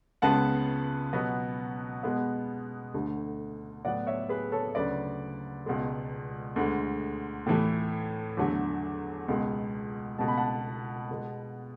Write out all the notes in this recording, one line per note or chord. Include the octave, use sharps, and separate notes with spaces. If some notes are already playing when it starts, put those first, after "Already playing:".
C#2 C#3 G#3 B3 F#5 A5
B2 F#3 B3
B2 G#3 B3
D2 D3 A3
A2 F#3 B3 D5 F#5
C#5 E5
G#4 B4
A4 C#5
D2 C#3 F#3 B4 D5
C#2 B2 G#3
D2 D3 G#3
A2 E3 A3
E2 D3 F#3 A3
C#2 B2 G#3
C#2 B2 A3 A5
B5
F#5 A5
B2 G#3 B3